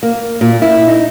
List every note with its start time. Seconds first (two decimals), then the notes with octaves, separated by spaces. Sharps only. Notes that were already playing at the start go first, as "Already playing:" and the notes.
0.03 A#3
0.41 A#2
0.62 E4
0.88 D#4